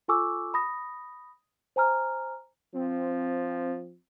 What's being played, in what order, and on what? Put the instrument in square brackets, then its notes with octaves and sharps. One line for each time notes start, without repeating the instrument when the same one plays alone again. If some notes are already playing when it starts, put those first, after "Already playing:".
[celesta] F4 A4 G#5 C#6 D6 E6
B5 D#6 A#6
C5 G#5 A#5 F6
[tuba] F3 [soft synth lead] C4